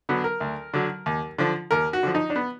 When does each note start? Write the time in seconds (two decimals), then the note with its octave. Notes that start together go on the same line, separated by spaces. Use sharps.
0.09 D3 F#3 B3
0.24 A#4
0.41 D2
0.74 D3 F#3
1.06 D#2
1.38 D3 F3
1.71 D#2 A#4
1.93 F#4
2.03 D3 F3
2.15 D#4
2.30 D4
2.36 B3